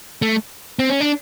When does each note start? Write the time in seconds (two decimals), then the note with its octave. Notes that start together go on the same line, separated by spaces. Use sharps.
0.22 A3
0.79 C4
0.90 C#4
1.00 D4